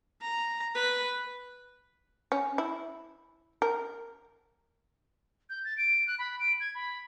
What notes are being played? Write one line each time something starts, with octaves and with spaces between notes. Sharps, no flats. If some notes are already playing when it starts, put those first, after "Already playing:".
A#5
B4
C#4
E4
A#4
G6
A6
D7
F#6
B5
D7
G#6
B5